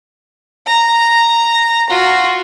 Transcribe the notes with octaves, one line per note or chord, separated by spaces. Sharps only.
A#5
F4 F#4